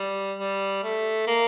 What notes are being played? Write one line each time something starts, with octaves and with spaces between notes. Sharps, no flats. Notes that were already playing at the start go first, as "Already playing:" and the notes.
Already playing: G3
G3
A3
A#3